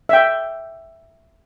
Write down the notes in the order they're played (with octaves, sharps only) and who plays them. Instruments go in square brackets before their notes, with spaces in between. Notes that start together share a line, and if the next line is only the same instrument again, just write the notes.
[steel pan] E5 G5